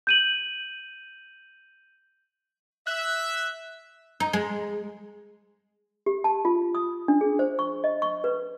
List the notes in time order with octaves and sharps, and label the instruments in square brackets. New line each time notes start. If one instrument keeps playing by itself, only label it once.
[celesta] G6 D#7 F#7
[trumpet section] E5 [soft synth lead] F#6
[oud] D#4
G#3
[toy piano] G4
A5
F4
D#6
D4
G#4
C5
C#6
D#5
C#6
B4